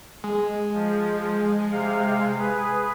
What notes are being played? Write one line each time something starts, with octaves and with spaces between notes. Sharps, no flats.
G#3
F3
C3 F5
G#4 B4